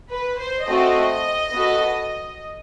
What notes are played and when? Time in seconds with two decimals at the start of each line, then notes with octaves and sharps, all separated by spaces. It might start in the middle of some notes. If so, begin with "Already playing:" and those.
0.11 B4
0.40 C5
0.68 A3 C4 F#4 A4 D#5
1.53 B3 F#4 A4